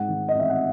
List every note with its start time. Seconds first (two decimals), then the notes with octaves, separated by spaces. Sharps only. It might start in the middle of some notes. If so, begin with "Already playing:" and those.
Already playing: G#2 F#5
0.08 D#3
0.28 D#5
0.34 A1
0.40 E5
0.50 F#5